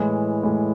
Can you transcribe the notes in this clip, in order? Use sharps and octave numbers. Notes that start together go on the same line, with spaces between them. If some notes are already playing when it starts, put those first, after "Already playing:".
Already playing: A2 E3 G#3
A2 E3 G#3